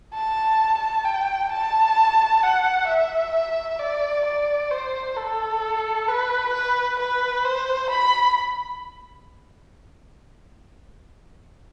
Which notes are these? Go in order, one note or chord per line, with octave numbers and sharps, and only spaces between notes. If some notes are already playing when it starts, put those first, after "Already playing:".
A5
G5
A5
F#5
E5
D5
D5
C5
A4
B4
B4
B4
C5
B5